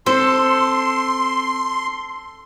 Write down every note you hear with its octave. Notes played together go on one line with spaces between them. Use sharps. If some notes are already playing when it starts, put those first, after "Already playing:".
C4 A4 C5 C6